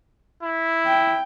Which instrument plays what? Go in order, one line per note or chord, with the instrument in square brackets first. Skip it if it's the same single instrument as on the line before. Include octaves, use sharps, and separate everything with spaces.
[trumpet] E4
[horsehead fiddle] G5